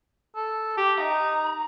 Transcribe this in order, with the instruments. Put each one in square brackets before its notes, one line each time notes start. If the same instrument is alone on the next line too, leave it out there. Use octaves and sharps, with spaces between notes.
[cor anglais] A4
G4
[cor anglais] D#4 [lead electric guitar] A#5